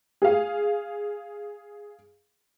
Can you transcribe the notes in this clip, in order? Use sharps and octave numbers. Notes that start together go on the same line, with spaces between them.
G#4 F5